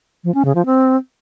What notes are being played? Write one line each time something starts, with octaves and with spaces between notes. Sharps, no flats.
F3
C#4
C#3
F3
C4